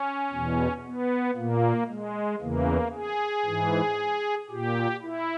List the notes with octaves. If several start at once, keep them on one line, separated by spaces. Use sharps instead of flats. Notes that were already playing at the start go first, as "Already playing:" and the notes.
Already playing: C#4
E2 B2
B3
A#2 A#3
G#3
E2 C#3 E3 A#3
G#4
G#2 E3
A#2 G4
E4